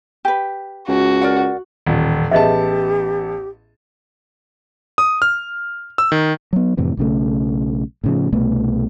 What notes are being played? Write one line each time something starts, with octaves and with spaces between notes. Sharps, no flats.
G4 B4
C#2 F#4
A#4 D5 F#5
D#1 A1
A1 B3 G4 G#4 D#5 E5 A5
D#6
F6
E6
D#3
F#3 B3
F2 A2 C3 E3
B1 C#3 A3
A2 C#3 F3
C2 B2 A3 B3